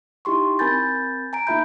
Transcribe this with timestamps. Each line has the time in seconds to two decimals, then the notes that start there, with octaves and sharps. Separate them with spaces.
0.25 D#4 E4 G4 C6 C#6
0.59 C4 A#4 G#5 B5 G6 A6
1.33 G#5 A#5 D7
1.47 A#3 D#4 F4 E5 B5 G6